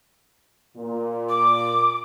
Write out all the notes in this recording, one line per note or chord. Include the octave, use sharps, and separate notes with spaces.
A#2
D6